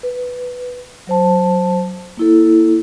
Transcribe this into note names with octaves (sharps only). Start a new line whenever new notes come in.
B4
F#3 C5 A5
A#3 E4 A4